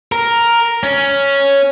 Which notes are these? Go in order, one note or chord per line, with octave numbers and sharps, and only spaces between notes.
A#4
C#4